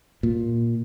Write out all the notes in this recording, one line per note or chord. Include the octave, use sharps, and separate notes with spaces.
A#2